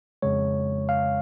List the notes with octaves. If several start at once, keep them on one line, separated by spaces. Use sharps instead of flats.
F2 C#3 G#3 C#5
F5